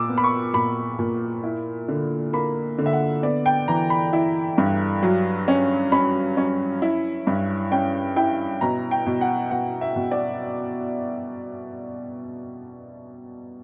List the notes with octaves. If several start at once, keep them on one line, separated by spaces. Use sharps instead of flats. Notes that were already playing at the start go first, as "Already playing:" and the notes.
Already playing: A#2 D6 E6
B3
B5
C#6
A#2 B5
A#2
E4
D3
A#3 B5
D3
E5
F#5
B3 D5
G5
E3 A#5
B5
E4
G2
F#3
C#4
C#4 B5
C#4
E4
G2
C#4 G5
E4 G5
B2 A#5
G5
B2
F#5
B2 F#5
E5
B2
D5